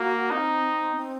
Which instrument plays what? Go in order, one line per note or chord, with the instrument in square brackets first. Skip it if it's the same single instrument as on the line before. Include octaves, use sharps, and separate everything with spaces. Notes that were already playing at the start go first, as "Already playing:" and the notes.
Already playing: [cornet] A#3 [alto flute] F#4
[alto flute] C4 [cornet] D#4
[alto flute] C4